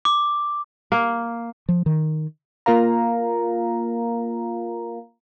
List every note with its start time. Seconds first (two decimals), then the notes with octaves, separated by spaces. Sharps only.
0.05 D6
0.92 A#3
1.69 F3
1.86 D#3
2.66 A#3 F4 A#4 F5 A#5